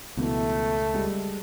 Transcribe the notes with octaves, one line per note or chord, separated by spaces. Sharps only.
C#2 B2 E3 A3
G3 G#3